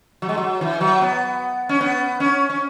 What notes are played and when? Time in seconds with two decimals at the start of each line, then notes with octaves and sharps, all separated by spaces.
0.22 F#3
0.29 G#3
0.37 F#3
0.61 E3
0.81 F#3
1.01 B3
1.69 C#4
1.81 B3
2.20 C#4
2.50 C#4